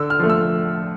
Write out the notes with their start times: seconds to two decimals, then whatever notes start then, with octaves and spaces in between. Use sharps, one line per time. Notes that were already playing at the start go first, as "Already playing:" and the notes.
Already playing: D3 E6
0.10 F6
0.19 F3 A3
0.30 E6